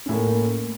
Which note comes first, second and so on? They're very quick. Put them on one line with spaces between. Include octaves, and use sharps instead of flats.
C#4 A2 A#3